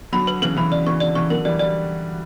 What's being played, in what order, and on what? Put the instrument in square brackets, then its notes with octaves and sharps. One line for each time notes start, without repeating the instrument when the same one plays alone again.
[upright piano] D3 F#3 [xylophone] B5
[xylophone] B4
[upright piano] C#3 E3 [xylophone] B4
[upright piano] C#3 E3 [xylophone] B5
[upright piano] C#3 [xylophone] D5
[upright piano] C#3 E3 [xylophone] C#6
[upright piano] D3 [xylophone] D5
[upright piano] C#3 E3 [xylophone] C#6
[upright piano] D3 F#3 [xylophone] A#4
[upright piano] E3 G3 [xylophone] D5
[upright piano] E3 G3 [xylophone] D5